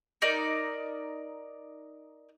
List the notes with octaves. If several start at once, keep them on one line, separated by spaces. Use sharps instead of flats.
D#4 A#4 D5